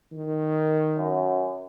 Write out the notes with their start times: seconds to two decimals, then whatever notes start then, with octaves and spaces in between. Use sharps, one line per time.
0.12 D#3
0.97 F#2